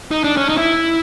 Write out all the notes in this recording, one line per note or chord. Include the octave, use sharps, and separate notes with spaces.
D#4
D4
C#4
D#4
E4